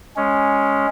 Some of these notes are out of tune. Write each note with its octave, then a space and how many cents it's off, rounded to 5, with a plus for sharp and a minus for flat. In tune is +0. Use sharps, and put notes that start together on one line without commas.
G#3 +0 C#4 +0